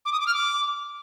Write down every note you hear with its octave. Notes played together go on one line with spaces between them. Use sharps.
D6
D#6
D6
F6
D6